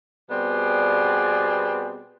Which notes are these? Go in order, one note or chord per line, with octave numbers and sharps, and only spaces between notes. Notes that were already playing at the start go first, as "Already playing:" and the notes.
B2 G3 B3 C4 G#4 D5